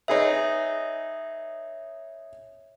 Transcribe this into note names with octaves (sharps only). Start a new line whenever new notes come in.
D#4 G#4 B4 C#5 E5